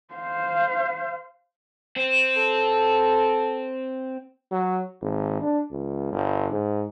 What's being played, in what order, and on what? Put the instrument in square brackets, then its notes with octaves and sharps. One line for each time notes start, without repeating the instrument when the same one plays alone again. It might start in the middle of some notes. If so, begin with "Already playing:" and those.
[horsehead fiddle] C5 F5
[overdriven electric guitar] C4
[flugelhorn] A4
[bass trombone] F#3
G#1
D4
C#2
G1
G#2